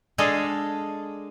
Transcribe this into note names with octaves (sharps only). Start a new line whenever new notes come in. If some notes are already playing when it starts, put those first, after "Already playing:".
G#3 D4 G#4 A4 D#5 F5